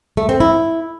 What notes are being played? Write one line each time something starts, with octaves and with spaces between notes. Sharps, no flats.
A3
C4
E4